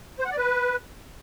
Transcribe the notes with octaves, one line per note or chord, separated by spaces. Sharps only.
C5
F#5
D5
B4